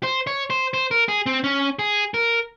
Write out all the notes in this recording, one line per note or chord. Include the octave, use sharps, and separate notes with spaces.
C5
C#5
C5
C5
A#4
G#4
C4
C#4
G#4
A#4